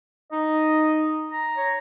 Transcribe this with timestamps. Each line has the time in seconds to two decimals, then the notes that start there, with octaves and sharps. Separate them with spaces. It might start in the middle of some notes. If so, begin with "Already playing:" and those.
0.32 D#4 D#5
1.32 A#5
1.57 C#5